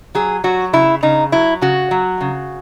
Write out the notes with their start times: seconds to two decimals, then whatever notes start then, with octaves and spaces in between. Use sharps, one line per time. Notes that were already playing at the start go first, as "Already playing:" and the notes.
0.15 F#3 G#4
0.44 F#3 F#4
0.73 C#3 E4
1.03 C#3 D#4
1.32 F#3 E4
1.61 C#3 F#4
1.91 F#3
2.21 C#3